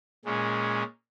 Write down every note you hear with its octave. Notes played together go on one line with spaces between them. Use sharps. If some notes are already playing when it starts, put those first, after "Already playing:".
A#2 G#3 C#4